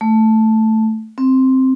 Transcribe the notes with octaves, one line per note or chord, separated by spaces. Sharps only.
A3
C4